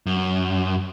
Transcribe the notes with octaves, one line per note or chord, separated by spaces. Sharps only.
F#2